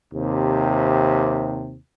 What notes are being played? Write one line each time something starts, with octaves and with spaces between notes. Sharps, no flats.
D#2 C3